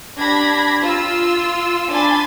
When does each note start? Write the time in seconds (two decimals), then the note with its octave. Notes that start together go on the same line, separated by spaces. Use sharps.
0.16 D4 G4 B5 G#6 A#6
0.80 F4 E6
1.90 D4 G#5 B5 C6 A6